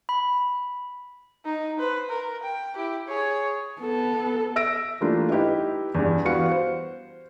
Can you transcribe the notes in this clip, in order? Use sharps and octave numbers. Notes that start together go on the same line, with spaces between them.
B5
D#4
B4 C5
A#4
G5
E4 G4
G#4 C#5
B3 A4
E5 E6 A#6 D7
E3 G3 A3 A#3 D4 F4
D#4 E4 G4 B4 E5
E2 G2
E3 G3 B3 F#4 F5 C#7
C5